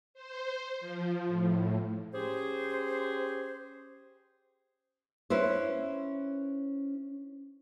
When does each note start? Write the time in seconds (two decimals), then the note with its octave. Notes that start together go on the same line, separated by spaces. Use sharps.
0.14 C5
0.80 F3
1.27 A2
2.14 C#4 G4 G#4 C5
5.30 C#4 E4 B4 C5